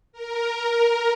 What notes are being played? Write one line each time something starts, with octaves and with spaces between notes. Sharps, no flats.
A#4